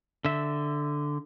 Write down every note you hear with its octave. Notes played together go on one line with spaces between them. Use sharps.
D3 E5